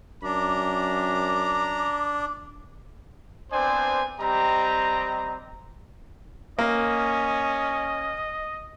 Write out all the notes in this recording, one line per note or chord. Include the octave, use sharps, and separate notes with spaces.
F#2 D4 A#5 D6
B3 C4 D4 C5 D5 G#5
G3 C4 G4 D#5 A#5
A#3 C#4 D#5